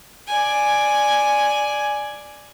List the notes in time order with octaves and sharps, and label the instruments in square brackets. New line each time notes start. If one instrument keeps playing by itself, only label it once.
[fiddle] D5 G#5